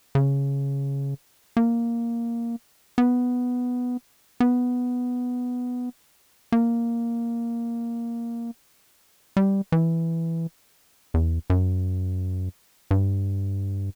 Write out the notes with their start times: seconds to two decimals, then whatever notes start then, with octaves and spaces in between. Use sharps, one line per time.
0.15 C#3
1.57 A#3
2.98 B3
4.40 B3
6.52 A#3
9.37 G3
9.72 E3
11.14 E2
11.50 F#2
12.91 G2